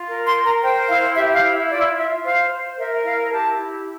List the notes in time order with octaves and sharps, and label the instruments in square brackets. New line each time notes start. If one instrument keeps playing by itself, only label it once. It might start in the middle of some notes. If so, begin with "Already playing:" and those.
Already playing: [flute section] F4
A#4
C6
A#4
A#5
C5 G5
E4 F5
G4 E5
F5
E4
E5
F4 D5
F4 E5
C5 F5
C5
A#4 E5
E4 F5
G4 A5
E4